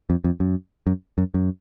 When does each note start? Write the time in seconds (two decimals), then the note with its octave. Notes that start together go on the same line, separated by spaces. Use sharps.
0.10 F2
0.24 F2
0.40 F#2
0.87 F#2
1.18 F#2
1.34 F#2